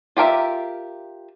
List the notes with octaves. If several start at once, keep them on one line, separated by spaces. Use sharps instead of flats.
F4 G4 A#4 E5